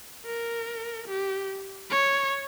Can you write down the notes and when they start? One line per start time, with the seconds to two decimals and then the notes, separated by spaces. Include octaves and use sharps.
0.26 A#4
1.08 G4
1.90 C#5